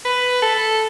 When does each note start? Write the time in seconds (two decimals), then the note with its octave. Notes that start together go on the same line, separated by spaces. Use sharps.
0.05 B4
0.42 A4